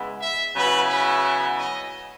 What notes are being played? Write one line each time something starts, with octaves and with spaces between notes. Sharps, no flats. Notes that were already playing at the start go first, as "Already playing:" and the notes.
Already playing: C#3 G#3 B3 E4
E5
C#3 F#3 B3 E4 B4
B4
C#5
D#5